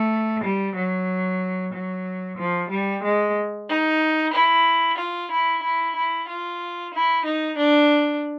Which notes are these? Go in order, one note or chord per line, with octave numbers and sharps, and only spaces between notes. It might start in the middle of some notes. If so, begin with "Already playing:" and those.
Already playing: A3
G3
F#3
F#3
F3
G3
G#3
D#4
E4
F4
E4
E4
E4
F4
E4
D#4
D4